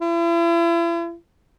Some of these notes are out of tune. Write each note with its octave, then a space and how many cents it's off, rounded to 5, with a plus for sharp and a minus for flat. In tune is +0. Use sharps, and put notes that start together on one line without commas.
E4 +40